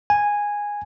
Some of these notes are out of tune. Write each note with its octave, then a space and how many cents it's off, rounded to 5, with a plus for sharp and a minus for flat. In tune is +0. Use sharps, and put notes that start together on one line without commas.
G#5 -10